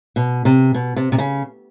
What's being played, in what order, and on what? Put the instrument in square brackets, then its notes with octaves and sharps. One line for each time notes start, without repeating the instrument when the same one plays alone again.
[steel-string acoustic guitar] B2
C3
B2
C3
C3
C#3